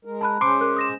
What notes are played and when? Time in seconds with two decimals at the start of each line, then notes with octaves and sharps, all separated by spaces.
0.05 G#3 A#4
0.21 A5 B5 F#6
0.41 G#3 C#4 C5 C6 D6
0.61 A#4 F#6
0.76 D#6 A#6 E7